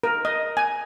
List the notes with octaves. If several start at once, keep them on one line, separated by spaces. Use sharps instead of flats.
A#4
D#5
G#5